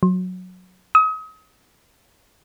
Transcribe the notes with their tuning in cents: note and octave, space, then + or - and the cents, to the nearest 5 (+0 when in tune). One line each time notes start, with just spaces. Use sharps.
F#3 -15
D#6 +35